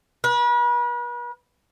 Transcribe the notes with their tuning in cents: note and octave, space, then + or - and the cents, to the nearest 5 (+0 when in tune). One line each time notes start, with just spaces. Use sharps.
B4 -40